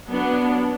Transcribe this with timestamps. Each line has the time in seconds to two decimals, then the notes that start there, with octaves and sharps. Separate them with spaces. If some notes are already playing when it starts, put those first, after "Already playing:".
0.09 F#3 B3 D4